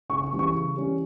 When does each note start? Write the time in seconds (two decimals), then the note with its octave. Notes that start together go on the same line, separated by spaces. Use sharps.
0.09 C#3 C#6
0.24 C#6
0.32 E3 G3 C#4
0.39 C#6
0.54 C#3
0.77 E3 G3 C#4